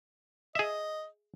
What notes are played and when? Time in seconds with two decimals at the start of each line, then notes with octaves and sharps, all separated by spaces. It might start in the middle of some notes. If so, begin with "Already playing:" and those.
0.55 G#4 D#5 E5